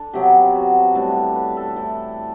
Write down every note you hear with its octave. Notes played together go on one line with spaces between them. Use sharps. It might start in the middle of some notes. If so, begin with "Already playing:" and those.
Already playing: D4 A4
C3 F#3 B3 G4
F#4
A2 G3 B3 D4 A4
B4
A4
E3 A3 C4 A4